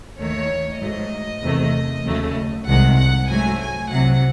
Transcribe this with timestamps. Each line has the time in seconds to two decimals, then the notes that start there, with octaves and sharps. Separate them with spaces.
0.18 D#2 D#3 A3 C#5
0.80 G#2 F#3 A3 D#5
1.42 E2 C3 D#3 A3
2.04 D#2 C#3 F#3 A3
2.67 C2 C3 D#3 G#3 F#5
2.98 F#5
3.29 G#2 F#3 A3 G#5
3.60 G#5
3.91 C2 C3 F#3 F#5